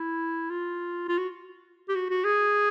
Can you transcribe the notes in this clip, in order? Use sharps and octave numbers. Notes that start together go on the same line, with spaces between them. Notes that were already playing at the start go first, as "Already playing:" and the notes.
Already playing: E4
F4
F4
F#4
G4
F#4
F#4
G#4